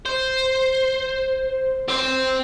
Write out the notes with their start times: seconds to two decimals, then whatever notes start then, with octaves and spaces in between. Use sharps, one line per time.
0.06 C5
1.88 C4 C5